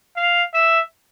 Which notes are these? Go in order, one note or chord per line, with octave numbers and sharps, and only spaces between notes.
F5
E5